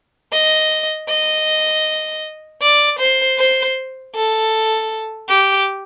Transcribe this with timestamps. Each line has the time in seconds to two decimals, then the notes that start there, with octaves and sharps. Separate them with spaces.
0.33 D#5
1.09 D#5
2.62 D5
2.99 C5
3.39 C5
4.15 A4
5.29 G4